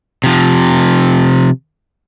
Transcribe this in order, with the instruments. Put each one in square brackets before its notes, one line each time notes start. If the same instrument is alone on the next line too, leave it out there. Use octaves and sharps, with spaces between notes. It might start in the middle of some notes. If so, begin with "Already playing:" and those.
[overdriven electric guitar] C3 F3